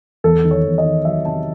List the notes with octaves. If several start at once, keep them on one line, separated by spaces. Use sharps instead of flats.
E2 A4
D#3
C#5
E2
D#5
D#3
F#3 E5
C3 A5